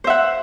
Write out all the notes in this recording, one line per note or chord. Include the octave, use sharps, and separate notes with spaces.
C5 E5 F#5